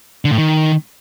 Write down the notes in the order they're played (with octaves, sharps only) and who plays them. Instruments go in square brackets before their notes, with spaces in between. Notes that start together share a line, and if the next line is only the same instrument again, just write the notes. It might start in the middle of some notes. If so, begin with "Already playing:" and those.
[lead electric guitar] D3
A2
D#3